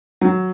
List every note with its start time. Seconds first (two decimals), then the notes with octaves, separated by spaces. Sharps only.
0.21 F#3